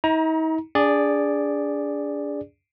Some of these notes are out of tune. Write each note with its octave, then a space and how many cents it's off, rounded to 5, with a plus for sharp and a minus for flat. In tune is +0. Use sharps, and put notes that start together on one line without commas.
D#4 +45 A#5 +25
D4 -30 G#4 -15 D5 +0